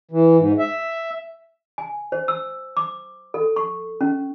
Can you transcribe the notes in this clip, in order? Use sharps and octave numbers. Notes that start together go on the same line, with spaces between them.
E3
G#2
E5
G#5
C5
E6
D6
A4
C#6
C#4